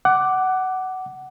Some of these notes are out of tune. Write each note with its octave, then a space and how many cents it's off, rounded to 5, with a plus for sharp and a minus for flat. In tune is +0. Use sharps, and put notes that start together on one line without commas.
F#5 +20 D6 +0